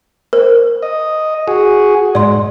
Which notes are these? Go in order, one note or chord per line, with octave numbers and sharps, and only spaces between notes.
A#4 C5
D#5
F#4 G#4
G#2 D5 C6